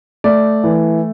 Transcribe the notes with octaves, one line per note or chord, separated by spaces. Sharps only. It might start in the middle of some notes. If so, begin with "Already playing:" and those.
A3 D5
E3